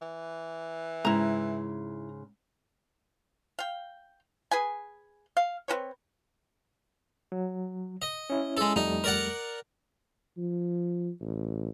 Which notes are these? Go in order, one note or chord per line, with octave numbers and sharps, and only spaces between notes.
E3
G#2 C#3 G#3 E4 A#5
F5 G5
G#4 B4 G#5
F5
C4 F#4 B4 C#5
F#3
D#5
C#4 E4
G#3 A4
F2 G3 A3 D#4
A#4 D5 F#5
F3
A1